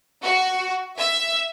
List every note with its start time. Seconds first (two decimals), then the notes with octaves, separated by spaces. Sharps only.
0.22 F#4
0.98 E5